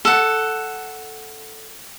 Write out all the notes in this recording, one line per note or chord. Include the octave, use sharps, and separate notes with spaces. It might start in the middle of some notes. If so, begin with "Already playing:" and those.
A4 F#5